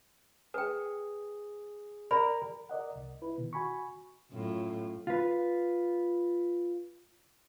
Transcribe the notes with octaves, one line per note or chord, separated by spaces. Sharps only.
G#4 B4 G5
A#4 D5 B5
A#4 D5 D#5 F#5
C2
E4 B4
B2 D#3
F#4 G#5 B5 C#6
F#2 A2 F4
F4 B4